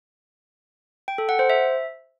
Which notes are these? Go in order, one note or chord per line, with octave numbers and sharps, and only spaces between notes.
G5
A4
F#5
C5
E5